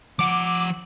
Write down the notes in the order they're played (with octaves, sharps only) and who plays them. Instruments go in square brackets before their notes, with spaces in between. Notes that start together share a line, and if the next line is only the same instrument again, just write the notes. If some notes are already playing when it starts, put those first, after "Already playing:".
[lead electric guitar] F3 F#5 [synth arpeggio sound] D6